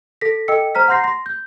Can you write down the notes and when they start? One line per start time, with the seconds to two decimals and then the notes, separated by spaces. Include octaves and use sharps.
0.21 A4 A#6 B6
0.48 A4 D#5 G5 E6 C#7
0.75 C5 A#5 F6 B6
0.88 F#5 A#5 C6 G6 A#6 C7
1.04 C6 A#6
1.26 G6